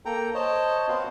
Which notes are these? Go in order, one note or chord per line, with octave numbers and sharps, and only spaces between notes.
A#3 A4 G5 A#5
C5 C#5 D#5 A5
B3 C4 F#4 B4 C5 F5